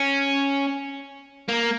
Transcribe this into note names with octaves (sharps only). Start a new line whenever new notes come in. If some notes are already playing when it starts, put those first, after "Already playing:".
Already playing: C#4
A#3